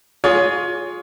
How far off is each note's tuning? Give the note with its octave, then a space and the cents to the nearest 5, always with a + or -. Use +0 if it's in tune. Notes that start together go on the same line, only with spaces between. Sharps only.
F4 +25 G#4 +0 C#5 +30